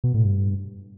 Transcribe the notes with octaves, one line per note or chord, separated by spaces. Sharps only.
B2
A2
G2